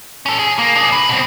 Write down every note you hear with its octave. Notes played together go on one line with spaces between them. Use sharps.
C#4 A4
G#4
A#3
D4 G#4
B4
B2 C4